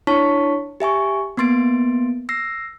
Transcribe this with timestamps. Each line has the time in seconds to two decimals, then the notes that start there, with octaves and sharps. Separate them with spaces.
0.07 D4 E4 C#5 A5 C#6 B6
0.80 G4 E5 G#5 C#6
1.37 A#3 B3 C6 A6 D7
2.29 E6 A#6 C7